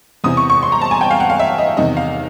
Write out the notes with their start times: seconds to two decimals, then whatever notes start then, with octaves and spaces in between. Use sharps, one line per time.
0.24 E2 C3 E3 D#6
0.37 C#6
0.50 C#6
0.63 C6
0.72 A#5
0.81 A5
0.91 G#5
1.01 G5
1.11 F5
1.20 F#5
1.30 F5
1.39 E5
1.58 D#5
1.77 E2 C3 D#3 D#5
1.97 F5